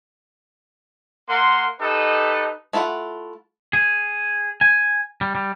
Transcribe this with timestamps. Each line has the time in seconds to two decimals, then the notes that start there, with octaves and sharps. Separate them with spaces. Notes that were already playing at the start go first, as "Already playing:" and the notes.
1.29 A#3 A#4 F#5 C6
1.81 D#4 G4 A4 B4 D#5
2.73 A3 E4 F4 B4 F#5
3.73 G#4
4.61 G#5
5.21 G3
5.35 G3